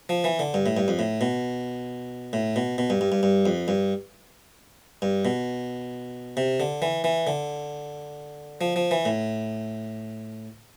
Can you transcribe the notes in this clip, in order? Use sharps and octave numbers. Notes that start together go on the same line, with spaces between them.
F3
E3
D3
G2
A2
G2
F2
A2
B2
A2
B2
B2
G2
G2
G2
G2
F2
G2
G2
B2
C3
D3
E3
E3
D3
F3
F3
E3
A2